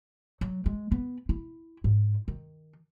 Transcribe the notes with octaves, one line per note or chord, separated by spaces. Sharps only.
F#3
G#3
B3
E4
G#2
D#3